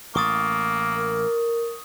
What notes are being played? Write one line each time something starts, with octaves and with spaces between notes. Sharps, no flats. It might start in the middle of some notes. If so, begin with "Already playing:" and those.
A1 A2 A#3 C#6 D#6 A6
A#4